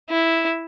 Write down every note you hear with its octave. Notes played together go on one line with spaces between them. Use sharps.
E4